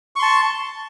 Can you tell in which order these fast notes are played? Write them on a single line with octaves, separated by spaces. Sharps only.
C#6 C6 A5